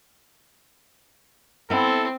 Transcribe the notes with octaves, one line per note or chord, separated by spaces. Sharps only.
B3 C4 E4 A4